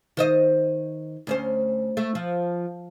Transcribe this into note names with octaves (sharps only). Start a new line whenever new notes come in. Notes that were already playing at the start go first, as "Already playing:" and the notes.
D#3 C5 D#5
D2 C#4 C5
A3
F3